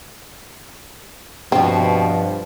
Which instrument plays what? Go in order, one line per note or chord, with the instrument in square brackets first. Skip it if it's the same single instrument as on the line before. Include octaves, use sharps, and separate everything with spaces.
[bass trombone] G2 [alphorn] B2 [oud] F3 F4 [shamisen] C4